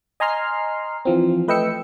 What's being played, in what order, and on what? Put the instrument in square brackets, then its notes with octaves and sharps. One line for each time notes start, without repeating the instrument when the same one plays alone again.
[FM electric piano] D#5 G#5 A#5 C6 F6 C7
E3 F3 C4
A3 B4 D#5 G5 E6 C#7